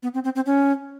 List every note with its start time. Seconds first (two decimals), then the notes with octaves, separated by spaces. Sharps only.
0.03 B3
0.14 C4
0.24 C4
0.35 C4
0.46 C#4